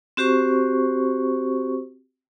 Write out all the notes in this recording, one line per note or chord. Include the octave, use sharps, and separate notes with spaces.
C4 F#4 G4 C5 C#6